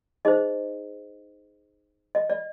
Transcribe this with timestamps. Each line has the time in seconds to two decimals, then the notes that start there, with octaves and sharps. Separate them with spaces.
0.25 D#4 G#4 C5 D#5
2.15 D#5
2.30 D5